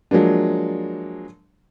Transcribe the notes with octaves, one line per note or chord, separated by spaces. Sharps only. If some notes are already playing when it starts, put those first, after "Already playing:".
F3 F#3 G#3 A#3 D4